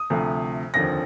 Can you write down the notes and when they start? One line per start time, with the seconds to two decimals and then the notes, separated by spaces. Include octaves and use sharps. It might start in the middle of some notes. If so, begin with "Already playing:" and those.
Already playing: D#6
0.10 D2 C3 F3 A3
0.74 F1 D#2 D3 F3 C4 A#6